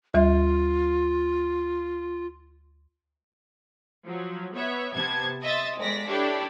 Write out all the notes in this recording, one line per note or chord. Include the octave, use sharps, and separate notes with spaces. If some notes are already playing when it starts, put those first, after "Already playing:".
D2 G3 F4 E5
F3 F#3
B3 C#5 E5
C3 B3 A5 G#6
D#5 E5 C6 A6
G1 G#3 D5 A#6 B6
D4 E4 G4 A4 C#5 D5